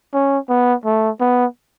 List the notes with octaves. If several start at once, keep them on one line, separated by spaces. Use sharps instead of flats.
C#4
B3
A3
B3